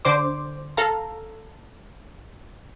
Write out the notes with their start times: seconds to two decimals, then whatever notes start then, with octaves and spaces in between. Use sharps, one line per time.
0.05 D3 C5 D6
0.77 A4 F5 A#5